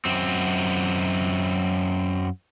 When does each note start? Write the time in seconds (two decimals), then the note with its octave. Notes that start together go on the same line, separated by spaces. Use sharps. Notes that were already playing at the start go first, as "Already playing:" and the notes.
0.05 F#2 C4